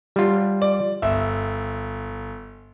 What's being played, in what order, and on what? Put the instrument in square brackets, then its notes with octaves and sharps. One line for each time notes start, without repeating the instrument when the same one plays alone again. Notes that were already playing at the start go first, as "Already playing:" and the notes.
[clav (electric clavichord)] G3 F4
[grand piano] D5
[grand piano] G1 [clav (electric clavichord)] E5